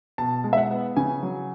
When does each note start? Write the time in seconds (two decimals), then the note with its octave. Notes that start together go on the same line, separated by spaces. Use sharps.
0.18 B2 A5
0.44 G#3
0.53 E5
0.57 F#5
0.71 B3
0.96 C#3 G#5
1.23 F#3